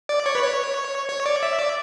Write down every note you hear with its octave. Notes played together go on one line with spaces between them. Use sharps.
D5
C#5
B4
C#5
C#5
D5
E5
D5